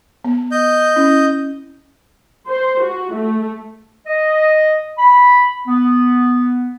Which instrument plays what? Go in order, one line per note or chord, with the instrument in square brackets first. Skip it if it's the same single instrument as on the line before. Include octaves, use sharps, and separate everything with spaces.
[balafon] B3
[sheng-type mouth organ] D#5 G6
[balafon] C#4 E4
[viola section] C5
F#4
A3
[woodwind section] D#5
B5
B3